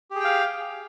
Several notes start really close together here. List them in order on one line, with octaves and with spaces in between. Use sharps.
G4 G#4 G5 F5